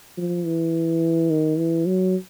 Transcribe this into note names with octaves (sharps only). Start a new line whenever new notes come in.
F3
E3
D#3
E3
F#3